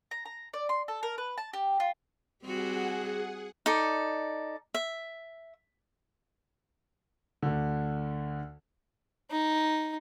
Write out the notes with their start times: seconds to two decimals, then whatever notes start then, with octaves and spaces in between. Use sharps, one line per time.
0.11 A#5
0.26 A#5
0.54 D5
0.69 C6
0.88 A4
1.03 A#4
1.18 B4
1.38 A5
1.53 G4
1.80 F4
2.44 G3 C4 F#4 G#4 F#5
3.66 D#4 A4 D5
4.74 E5
7.42 D2 D3
9.31 D#4